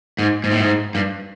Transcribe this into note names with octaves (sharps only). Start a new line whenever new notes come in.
G#2
G#2
A2
G#2
G2